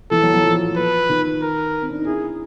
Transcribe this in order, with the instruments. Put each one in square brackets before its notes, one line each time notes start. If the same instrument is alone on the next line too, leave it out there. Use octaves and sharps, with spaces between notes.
[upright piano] E3 [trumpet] A4
[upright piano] F#3
F#3
F3
[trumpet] B4
[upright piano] D#3
[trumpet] A#4
[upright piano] C4
D4
D#4
[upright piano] E4 [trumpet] G#4